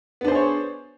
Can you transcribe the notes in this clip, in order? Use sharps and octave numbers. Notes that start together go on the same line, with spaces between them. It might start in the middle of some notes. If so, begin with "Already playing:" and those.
B3 D4 G#4 C5 C#5